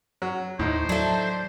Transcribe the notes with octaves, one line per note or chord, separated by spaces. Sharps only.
F#3
D#2 A2 D#4 C5
F#3 A3 D4